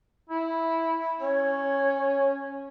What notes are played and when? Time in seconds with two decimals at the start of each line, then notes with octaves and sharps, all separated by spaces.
0.30 E4
1.21 C#4 C#5